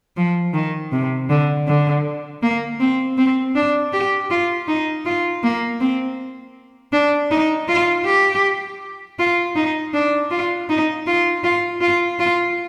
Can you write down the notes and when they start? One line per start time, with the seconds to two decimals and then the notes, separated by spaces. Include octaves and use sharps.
0.17 F3
0.54 D#3
0.92 C3
1.30 D3
1.68 D3
2.43 A#3
2.80 C4
3.18 C4
3.55 D4
3.93 G4
4.30 F4
4.68 D#4
5.06 F4
5.43 A#3
5.80 C4
6.93 D4
7.31 D#4
7.68 F4
8.05 G4
9.19 F4
9.56 D#4
9.94 D4
10.31 F4
10.69 D#4
11.07 F4
11.44 F4
11.81 F4
12.20 F4